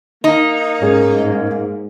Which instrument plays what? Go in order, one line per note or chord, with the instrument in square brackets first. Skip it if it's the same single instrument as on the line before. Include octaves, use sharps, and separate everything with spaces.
[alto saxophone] A#3 [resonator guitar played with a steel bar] D#4
[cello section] G#2 [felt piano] C#4 G#4 A#4